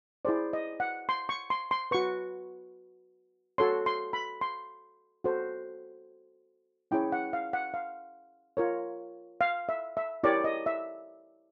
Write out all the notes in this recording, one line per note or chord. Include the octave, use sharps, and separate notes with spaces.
E4 G#4 C5 D5
D#5
F#5
C6
C#6
C6
C6
F#4 B4 C#6
F#4 A4 C#5 C6
C6
B5
C6
F#4 A4 C5
C#4 E4 G#4 C#5 G5
F#5
F5
F#5
F5
F4 A#4 C#5
F5
E5
E5
E4 G4 A#4 C#5 D5
D#5
E5